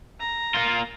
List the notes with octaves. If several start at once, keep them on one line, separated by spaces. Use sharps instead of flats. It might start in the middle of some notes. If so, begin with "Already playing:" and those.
A#5
A#3 F4